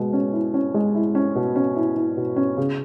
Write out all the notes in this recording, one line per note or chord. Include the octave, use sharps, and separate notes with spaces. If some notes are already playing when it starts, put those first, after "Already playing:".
Already playing: B2 G#3
C#4
E4
C#4
G#3
E4
C#4
B2
C#4
E4
E4
B2
C#4
C#3